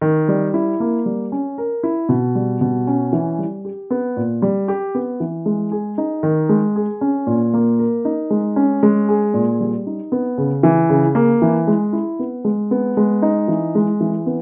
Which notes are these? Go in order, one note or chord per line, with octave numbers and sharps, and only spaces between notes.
D#3
G3
E4
A#3
G3
C#4
A#4
E4
B2
G3
B2
C#4
E3
G3
G4
B3
A#2
G3
G4
B3
E3
G#3
G#4
D#4
D#3
G#3
G#4
C#4
A#2
A#3
A#4
D#4
G#3
C#4
G#3
G#4
A#2
G3
D#4
B3
C#3
E3
C#3
A#3
E3
G#3
E4
B3
G#3
B3
G#3
D#4
E3
G#3
E3
B3